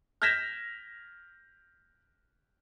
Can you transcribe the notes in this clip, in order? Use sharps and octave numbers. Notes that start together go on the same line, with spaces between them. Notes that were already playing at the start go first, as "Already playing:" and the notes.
F6 G6 G#6 A#6 B6 E7